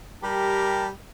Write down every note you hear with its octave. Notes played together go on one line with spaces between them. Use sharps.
G3 G4 A#4 A5